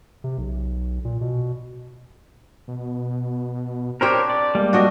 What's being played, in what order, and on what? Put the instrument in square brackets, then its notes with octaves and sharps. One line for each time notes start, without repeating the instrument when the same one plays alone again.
[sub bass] C3
B1
A#2
B2
[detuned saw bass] B2
[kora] C4 D4 G4 [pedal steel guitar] A#4 C5 C#5
[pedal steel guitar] D5
[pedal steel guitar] G3 A#3 [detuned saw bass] G#3
[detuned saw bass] F#3 [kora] D4 F#4 D#5